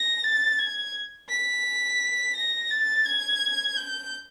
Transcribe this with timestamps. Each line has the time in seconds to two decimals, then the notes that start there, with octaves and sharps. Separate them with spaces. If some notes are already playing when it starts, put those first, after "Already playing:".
Already playing: A#6
0.24 A6
0.59 G#6
1.29 B6
2.36 A#6
2.70 A6
3.05 G#6
3.76 G6